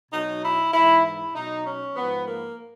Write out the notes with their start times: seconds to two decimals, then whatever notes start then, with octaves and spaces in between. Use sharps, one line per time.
0.10 B2 F#3 D#4
0.42 E4
0.72 G#2 E3 E4
1.03 E4
1.33 B2 F#3 D#4
1.64 C#4
1.96 G#2 F3 B3
2.26 A#3